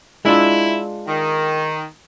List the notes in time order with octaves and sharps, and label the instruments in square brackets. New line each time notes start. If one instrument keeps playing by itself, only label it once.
[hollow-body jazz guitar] G#3 D4 F4 [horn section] E4
[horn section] D#3